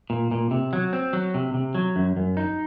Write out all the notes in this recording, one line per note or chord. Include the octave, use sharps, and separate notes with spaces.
A#2
A#2
C3
F#3
C4
F#3
C3
C3
F#3
F#2
F#2
D#4